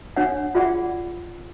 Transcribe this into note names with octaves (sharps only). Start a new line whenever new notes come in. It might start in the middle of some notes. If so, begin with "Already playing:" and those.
D4 C#5 F#5
F4 G#4 D5 F#5